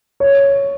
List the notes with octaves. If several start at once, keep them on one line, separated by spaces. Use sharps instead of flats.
C#5